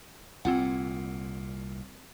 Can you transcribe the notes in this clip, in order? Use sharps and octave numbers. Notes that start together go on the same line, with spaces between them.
C2 A#2 C4 F4 F#5